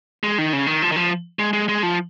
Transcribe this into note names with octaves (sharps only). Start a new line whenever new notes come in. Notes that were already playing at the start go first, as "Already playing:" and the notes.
G#3
D#3
C#3
D#3
F3
D#3
F3
G#3
G#3
G#3
F3